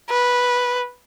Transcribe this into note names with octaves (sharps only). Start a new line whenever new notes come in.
B4